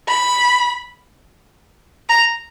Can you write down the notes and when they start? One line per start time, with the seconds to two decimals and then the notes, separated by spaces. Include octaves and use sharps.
0.08 B5
2.09 A#5